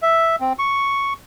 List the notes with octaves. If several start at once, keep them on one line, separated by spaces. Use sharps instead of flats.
E5
C4
C#6